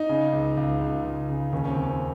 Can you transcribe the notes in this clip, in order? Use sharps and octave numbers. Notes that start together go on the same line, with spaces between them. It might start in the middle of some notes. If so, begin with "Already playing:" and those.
Already playing: D#4
C#3
C#2
C#2
C#2
C#2
C#3
D#2 C#4
C#4
C4
D#2
C4